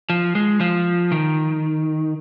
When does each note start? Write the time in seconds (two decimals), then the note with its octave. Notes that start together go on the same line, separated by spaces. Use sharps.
0.10 F3
0.35 G#3
0.60 F3
1.12 D#3